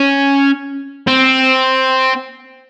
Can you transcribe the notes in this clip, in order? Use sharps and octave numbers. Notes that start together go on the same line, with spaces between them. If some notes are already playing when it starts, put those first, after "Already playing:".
Already playing: C#4
C4